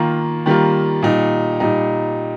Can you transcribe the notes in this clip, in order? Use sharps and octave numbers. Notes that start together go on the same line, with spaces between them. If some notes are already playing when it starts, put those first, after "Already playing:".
Already playing: D#3 A#3 F4
D#3 G3 A#3 F4
A#2 G3 D#4
A#2 G3 D#4